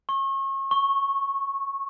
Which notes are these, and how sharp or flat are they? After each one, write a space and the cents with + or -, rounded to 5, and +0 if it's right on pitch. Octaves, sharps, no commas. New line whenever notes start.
C#6 -35
C#6 -10